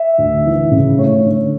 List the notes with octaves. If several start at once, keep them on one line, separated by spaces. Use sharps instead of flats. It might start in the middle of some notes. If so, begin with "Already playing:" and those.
Already playing: E5
D2
E3
C#3
A3 C#5
D3